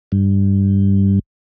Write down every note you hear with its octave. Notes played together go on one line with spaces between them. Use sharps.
G2